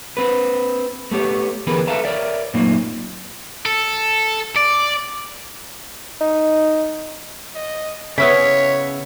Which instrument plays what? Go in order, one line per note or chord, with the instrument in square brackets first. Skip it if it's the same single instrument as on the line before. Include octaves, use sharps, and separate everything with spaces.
[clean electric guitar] C4 B4
A3 B3 G4 C#5
D2 E3 B3 G#4 A#4 B4
A4 B4 E5 F5 A5 A#5
A#4 C#5 D5 E5
F#2 A#2 A3 A#3 C4 D#4
[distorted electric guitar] A4
D5
[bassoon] D#4
[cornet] D#5
[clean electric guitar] C#3 E5 [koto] B3 C#4 E4 [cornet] C#5 [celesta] B6